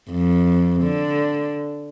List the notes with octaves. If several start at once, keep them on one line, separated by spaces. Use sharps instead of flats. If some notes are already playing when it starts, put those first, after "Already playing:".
F2
D3